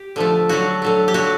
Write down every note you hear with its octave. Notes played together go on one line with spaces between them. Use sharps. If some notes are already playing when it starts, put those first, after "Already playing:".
Already playing: G4
D3 F3 A3
D3 F#3 A3 F#4
D3 F#3 A3
G4
D3 F#3 A3 F#4